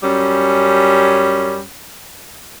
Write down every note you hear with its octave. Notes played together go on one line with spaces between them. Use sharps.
F#2 G3 C#4